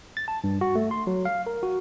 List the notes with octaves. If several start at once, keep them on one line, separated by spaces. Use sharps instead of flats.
A6
A5
G2
F#4
A3
C6
F#3
F5
A#4
F#4